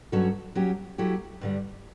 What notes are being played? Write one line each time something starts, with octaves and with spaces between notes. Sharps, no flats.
G2 F#3 C#4 F#4 A4
F#3 C#4 G4
F#3 A3 E4 G4
G2 D3 G3